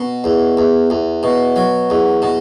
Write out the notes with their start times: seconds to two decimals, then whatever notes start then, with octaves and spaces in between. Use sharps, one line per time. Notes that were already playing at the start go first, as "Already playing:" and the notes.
Already playing: B2
0.24 E2
0.57 E2
0.90 E2
1.23 B2
1.56 F#3
1.90 E2
2.22 B2